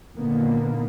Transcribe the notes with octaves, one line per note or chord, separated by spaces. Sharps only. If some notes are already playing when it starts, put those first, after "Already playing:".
A#2 D3 D#3 A#3 B3